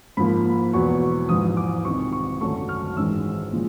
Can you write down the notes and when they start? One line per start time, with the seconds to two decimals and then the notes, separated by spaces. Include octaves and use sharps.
0.17 G#2 F3 A#3 B5
0.73 E2 B2 F#3 B3 E4 C#6
1.29 A#1 G#2 E3 D#6
1.57 D6
1.85 C2 C3 D#3 C#6
2.12 C#6
2.41 G#1 F#2 D3 F#3 A3 C#6
2.69 F6
2.96 A1 G#2 D#3 G#3 E6
3.53 A#2 F3 G#3